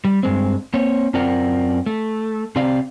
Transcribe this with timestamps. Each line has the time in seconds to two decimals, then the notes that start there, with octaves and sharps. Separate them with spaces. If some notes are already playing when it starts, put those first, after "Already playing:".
0.05 G3
0.23 G2 G#3 C4
0.74 A#3 C4 C#5
1.14 F#2 C4 F4 A#4 D5 F#5
1.86 A3
2.56 C3 C4 G4 D5 F5